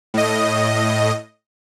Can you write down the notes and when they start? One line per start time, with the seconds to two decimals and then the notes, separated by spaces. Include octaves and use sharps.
0.14 A2 D#5